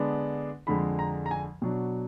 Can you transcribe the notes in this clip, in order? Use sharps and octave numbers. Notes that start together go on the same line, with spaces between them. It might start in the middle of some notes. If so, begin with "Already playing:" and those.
Already playing: D3 G#3 B3 D4
F2 D3 G#3 B5
A#5
A#5
G#5
B2 F#3 D4